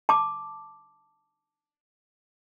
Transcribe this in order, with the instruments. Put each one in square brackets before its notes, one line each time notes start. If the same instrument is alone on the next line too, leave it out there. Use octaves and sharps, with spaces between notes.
[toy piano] A5 D6